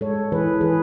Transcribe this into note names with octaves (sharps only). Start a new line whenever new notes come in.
G#3 A4 C#5
E3 G#4 B4
E3 G#4 B4